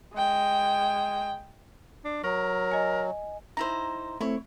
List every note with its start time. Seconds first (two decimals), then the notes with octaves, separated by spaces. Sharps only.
0.14 G#3 G5
2.05 D4
2.24 F#3 A#4 C#6
2.72 D#5 G#5
3.57 D#4 E4 C5 A#5
4.21 A3 C4 E4 C#5